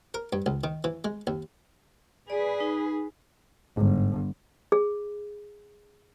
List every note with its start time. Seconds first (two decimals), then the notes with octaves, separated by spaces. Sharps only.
0.14 A#4
0.33 G2
0.46 C#2
0.64 D#3
0.84 E3
1.05 G#3
1.27 D#2
2.30 G#4 B4 D5
2.60 D#4
3.77 G1 G#2
4.72 G#4